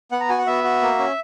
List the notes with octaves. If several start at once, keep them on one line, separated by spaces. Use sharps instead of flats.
B3 F#5
A#5
F#4 G#5
F#5
B3 E5
F#4
A#3
C#4